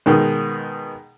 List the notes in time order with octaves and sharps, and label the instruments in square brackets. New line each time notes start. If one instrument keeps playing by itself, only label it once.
[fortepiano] B2 D#3 G#3